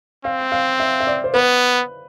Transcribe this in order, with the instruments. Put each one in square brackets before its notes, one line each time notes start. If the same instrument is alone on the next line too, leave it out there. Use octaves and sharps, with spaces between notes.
[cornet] C4 [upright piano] F5
[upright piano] F5
E5
E5
D5
C5
[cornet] B3 [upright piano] B4